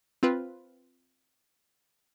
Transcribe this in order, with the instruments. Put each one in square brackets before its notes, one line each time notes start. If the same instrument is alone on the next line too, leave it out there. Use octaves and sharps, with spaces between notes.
[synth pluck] C4 F4 B4